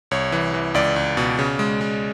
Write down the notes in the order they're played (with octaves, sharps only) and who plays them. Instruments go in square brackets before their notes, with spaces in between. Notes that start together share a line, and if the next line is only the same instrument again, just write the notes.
[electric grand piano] C2 C#5
E3
E3
C#2 D5
C#2
B2
C#3
G#3
G#3